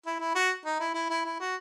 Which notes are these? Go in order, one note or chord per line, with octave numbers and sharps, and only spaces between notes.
E4
E4
F#4
D#4
E4
E4
E4
E4
F#4